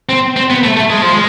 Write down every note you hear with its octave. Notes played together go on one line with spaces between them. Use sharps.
C4
C4
B3
A3
A3
G#3
F3
G#3